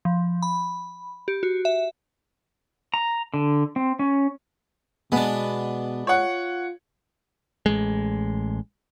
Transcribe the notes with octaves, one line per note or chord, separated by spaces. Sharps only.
F3
B5
G4
F#4
E5
A#5
D3
C4
C#4
B2 G#3 B3 D4
F4 C#5 F#5
A1 G#3